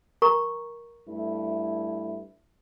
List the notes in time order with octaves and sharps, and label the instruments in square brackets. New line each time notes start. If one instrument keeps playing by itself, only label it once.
[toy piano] A#4 A#5 C#6
[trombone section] G2 A3 E4